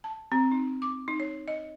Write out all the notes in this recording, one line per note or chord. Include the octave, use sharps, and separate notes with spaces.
A5
C4
D#4
D6
D#4
C#5
D#5